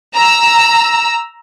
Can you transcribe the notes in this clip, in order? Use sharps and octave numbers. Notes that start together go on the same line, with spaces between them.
A#5 E6